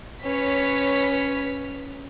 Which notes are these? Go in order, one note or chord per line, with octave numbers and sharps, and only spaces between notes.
C#4 B4 C#5 B6